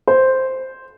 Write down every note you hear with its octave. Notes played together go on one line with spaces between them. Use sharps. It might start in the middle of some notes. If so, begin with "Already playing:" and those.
C5